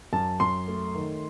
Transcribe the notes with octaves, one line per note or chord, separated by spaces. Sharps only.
F#2 A5
F#2 C6
A3
D#3